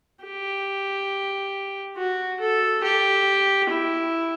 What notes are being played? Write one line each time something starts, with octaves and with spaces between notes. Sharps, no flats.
G4
F#4
A4
G4
E4